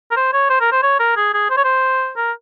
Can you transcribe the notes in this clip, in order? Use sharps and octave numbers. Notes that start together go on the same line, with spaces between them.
A#4
C5
C#5
C5
A#4
C5
C#5
A#4
G#4
G#4
C5
C#5
C5
A#4